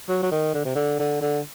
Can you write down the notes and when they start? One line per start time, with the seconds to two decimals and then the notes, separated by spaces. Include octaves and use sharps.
0.09 F#3
0.23 F#3
0.32 D#3
0.54 D3
0.65 C3
0.75 D3
1.00 D3
1.21 D3